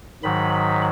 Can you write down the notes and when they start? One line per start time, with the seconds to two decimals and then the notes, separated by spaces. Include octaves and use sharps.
0.23 G#2 D#3 F#3 B5
0.54 B5